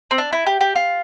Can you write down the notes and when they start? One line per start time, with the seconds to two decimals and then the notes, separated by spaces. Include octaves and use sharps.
0.11 C4
0.18 D4
0.33 E4
0.46 G4
0.61 G4
0.75 F4